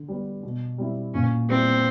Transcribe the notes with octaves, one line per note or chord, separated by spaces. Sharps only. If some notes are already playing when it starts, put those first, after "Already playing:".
Already playing: D3
G3 B3
B2
G3 C4 E4
A#2 C#4
G3 B3 C4 E4